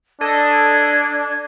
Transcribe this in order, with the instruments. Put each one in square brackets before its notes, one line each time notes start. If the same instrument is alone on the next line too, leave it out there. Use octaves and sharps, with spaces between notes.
[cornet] D4 [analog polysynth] A4 D#5 [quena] G#6